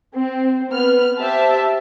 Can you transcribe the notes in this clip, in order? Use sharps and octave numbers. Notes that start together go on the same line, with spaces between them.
C4
B3 F6
G4 C5 E5 A5